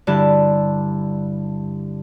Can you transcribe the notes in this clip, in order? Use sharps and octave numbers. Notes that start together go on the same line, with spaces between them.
G2 D3 E4 A5